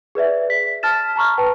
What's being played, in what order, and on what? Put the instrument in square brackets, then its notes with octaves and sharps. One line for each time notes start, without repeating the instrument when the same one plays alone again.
[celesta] G#4 B4 D5 E5
B6
A5 F6 A6 E7
A5 A#5 C#6 F6
B4 G5 A5